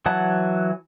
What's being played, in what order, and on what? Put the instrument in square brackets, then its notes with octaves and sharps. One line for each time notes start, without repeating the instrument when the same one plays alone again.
[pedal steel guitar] E3 F#3 F#5 A5